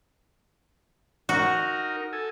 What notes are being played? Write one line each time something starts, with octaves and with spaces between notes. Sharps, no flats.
D#4 F#4 A#4
A4 G#5